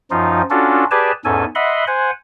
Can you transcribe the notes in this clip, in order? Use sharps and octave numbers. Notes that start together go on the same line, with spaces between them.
F#2 F3 D#4 F4
C#4 D4 F4 F#4 A4
G4 G#4 B4 D5 G#5 A5
E2 G#2 C#4 A4 G#5
D#5 E5 F#5 B5 C6
C5 F#5 G#5